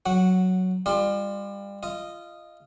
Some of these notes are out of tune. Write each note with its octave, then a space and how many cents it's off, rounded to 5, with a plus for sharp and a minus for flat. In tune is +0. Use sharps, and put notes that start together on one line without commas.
F#3 +0 F#4 +0 F#5 -15
G3 +35 F4 +0 D5 +35
F4 -20 D#5 -5